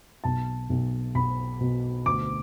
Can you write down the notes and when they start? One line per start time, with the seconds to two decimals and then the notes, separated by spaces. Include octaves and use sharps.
0.24 B1 A5
0.69 B1
1.15 B1 B5
1.61 B2
2.06 D2 D6